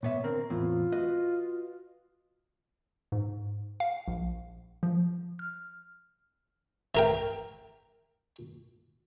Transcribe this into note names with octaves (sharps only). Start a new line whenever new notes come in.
A#2 B3 C#5 E5
D3 C4 A#4
E2 A2 C4 F4
F#4 B4 D#5
G#2
F5
A#1
F3
F6
E3 A#4 G5